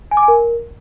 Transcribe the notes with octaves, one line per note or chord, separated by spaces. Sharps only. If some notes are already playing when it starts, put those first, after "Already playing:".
G#5
D6
G#5
A#4